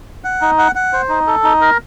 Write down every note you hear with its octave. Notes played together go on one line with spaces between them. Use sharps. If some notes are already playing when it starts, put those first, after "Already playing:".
F#5
D#4
F#5
F#5
C5
D#4
A4
D#4
A#4